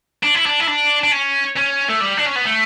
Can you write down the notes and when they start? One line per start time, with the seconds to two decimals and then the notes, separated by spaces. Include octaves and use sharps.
0.23 D4
0.35 E4
0.46 D4
0.60 E4
0.67 D4
1.03 D4
1.12 C#4
1.57 C#4
1.89 A3
2.01 G3
2.17 D4
2.26 C#4
2.36 B3
2.45 A3